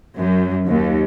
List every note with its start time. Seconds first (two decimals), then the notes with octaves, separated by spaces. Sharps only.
0.16 F#2
0.66 D#2